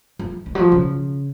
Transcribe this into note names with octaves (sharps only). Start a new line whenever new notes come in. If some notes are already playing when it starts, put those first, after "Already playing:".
F3
D#3
F#3
F3
C#3